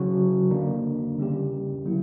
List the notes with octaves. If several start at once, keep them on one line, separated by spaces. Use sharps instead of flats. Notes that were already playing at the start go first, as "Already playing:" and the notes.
Already playing: C#3 F#3 C#4 F#4
D3 A#3 D4
C#3 G3 C#4 G4
D3 F#3 A#3 E4